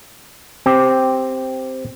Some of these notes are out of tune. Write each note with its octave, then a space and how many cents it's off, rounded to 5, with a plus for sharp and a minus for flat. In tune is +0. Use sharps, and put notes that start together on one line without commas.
C4 +0 G4 +0